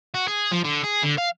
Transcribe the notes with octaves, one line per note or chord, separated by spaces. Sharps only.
F#4
G#4
F3
D3
G#4
D3
F5